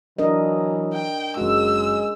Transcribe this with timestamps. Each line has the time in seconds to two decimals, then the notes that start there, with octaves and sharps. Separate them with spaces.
0.18 E3 F#3 D4 A#4 D#5
0.94 G5
1.37 F#1 G#3 F#4 E6